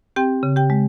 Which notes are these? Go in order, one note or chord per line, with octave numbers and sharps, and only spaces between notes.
C4 G4 G5
C#3
G4 G5
G#3